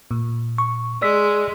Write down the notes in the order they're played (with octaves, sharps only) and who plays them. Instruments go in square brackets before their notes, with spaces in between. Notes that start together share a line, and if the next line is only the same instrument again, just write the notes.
[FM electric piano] A#2
[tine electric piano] C#6
[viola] G#3 [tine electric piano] D5 E6 B6